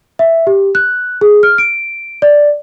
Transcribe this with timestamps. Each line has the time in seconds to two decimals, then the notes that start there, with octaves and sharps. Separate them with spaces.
0.19 E5
0.47 G4
0.75 F#6
1.21 G#4
1.43 F6
1.58 D7
2.22 D5